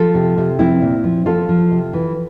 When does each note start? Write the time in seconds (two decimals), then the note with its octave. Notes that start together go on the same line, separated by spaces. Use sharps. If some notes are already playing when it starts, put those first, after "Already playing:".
Already playing: F3 F4 A4
0.15 C3
0.38 C3
0.59 F3 C4 E4
0.82 A#2
1.04 F3
1.26 F3 F4 A4
1.49 F3
1.71 C3
1.93 E3